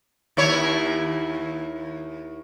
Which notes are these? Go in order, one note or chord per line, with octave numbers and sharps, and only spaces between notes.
D#2 E4 C#5